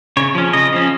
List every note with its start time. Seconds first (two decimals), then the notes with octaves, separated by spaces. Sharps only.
0.17 C#3 C#5
0.35 F3 C#4
0.53 C#3 D#5
0.73 F3 C#4